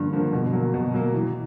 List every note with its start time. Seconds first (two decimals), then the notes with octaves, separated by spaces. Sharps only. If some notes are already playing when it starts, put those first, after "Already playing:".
Already playing: G2 D3 F3 A#3
0.12 D3 F3 A#3
0.33 B2
0.53 F#3 A#3
0.74 B2
0.94 F#3 A#3
1.14 E3